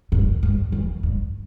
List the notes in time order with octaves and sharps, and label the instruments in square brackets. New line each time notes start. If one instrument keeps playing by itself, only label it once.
[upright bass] G2
G2
E2
G2